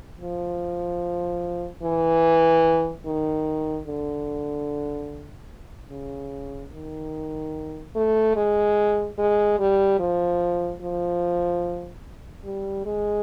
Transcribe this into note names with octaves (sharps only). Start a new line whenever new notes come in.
F3
E3
D#3
D3
C#3
D#3
A3
G#3
G#3
G3
F3
F3
G3
G#3